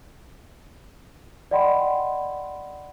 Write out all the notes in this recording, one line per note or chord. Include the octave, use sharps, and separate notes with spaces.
D5 D#5 F#5 G5 B5 C6